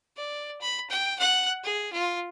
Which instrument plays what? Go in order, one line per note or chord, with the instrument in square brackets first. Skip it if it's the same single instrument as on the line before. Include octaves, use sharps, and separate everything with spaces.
[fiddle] D5
B5
G5
F#5 F#6
G#4
F4